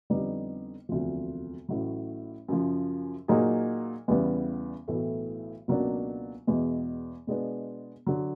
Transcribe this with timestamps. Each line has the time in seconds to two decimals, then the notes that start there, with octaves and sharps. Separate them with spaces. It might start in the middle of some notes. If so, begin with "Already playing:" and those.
0.10 F2 D3 G3 B3 D#4
0.89 E1 D2 C3 F3
1.69 A1 A2 F#3
2.48 F#2 C#3 F3
3.28 A#2 F#3 A#3 D#4 G#4
4.08 E2 C#3 E3 G3 B3
4.88 B1 A2 E3 A3
5.68 C#2 B2 F#3 A#3 D4
6.47 E2 B2 G#3
7.27 B2 G#3 B3 D4
8.07 D3 F#3